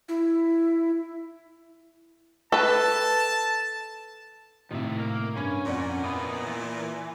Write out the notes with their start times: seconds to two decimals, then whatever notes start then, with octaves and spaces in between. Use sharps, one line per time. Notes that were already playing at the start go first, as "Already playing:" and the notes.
0.09 E4
2.52 A4 B4 A5
4.71 A2 C3 D#3 E5
4.97 A#3 A#4
5.36 G2 C#4 B5 G#6
5.66 F2 A#2 D5 F#5
6.04 B3 E4 D#5 B5
6.47 E3